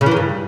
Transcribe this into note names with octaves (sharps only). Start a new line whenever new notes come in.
C#3
E3
D#3
G2